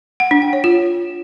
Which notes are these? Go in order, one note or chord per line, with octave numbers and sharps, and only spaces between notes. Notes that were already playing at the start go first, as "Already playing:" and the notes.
F#5
D4
G5
C#5
F4